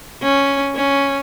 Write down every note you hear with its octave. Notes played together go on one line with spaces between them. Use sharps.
C#4
C#4